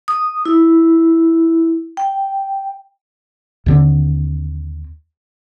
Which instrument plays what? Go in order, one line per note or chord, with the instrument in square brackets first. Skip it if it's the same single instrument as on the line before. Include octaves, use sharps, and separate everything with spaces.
[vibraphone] D#6
E4
G5
[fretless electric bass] D#2 D3 C4